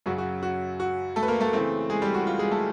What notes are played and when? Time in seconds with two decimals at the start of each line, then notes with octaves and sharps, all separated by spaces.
0.06 F#2 C#3 F#3 F#4
0.18 F#4
0.43 F#4
0.80 F#4
1.16 A3 A4
1.23 B4
1.28 A#3 A#4
1.41 A3 A4
1.53 C#3 E3 A3 C4
1.90 G#3 G#4
2.02 G3 G4
2.14 F#4
2.27 F4
2.39 G#3 G#4
2.52 A3 A4